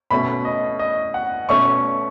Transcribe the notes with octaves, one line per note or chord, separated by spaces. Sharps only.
B2 A3 C#4 B5
D#5
D#5
F#5
B2 A3 C#4 C#6